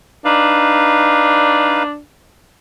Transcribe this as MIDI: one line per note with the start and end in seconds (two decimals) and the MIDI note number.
0.25 2.00 62
0.25 1.83 63
0.25 1.83 71
0.25 1.83 77